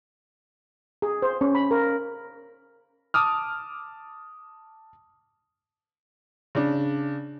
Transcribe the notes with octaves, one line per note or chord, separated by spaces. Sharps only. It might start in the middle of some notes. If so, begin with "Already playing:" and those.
G#4
C5
C#4
B5
A#4
A5 D6 D#6 F6
C#3 D4